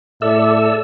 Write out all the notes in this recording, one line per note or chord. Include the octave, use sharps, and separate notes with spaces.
A2 A4 D5 E5 E6